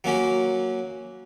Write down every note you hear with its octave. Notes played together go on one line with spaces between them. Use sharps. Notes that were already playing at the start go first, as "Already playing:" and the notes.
F#3 A#3 C#4 F#4